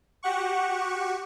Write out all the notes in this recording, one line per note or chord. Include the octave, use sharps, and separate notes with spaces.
F#4 G4 F#5 C#6